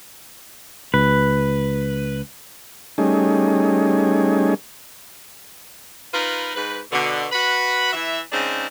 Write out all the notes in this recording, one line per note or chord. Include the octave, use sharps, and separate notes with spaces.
C#2 B4
G3 A3 C#4 D#4 G#4
D#4 F4 A#4 B4
G#2 B4
B2 D3
F#4 B4 F#5 B5
E3 E5
C#3 G#3 C4 D4 D#4